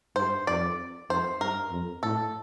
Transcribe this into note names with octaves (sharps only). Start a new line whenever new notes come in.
G2 C5
F2 D5
F2 C5
G2 A#4
F2
A2 A4